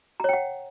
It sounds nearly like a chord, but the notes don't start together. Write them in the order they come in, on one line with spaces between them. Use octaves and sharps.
A#5 C#5 G5 F#5